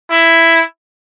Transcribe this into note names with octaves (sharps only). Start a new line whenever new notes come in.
E4